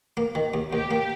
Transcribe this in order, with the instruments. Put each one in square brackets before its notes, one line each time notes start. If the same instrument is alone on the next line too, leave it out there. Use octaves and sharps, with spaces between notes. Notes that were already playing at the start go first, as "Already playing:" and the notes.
[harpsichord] A#3
D#3
D#2
[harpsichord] D#2 [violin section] G4
[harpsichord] A#3